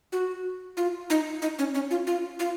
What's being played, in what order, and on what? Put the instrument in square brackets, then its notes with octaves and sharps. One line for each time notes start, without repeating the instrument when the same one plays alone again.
[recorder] F#4
F4
D#4
D#4
C#4
C#4
F4
F4
F4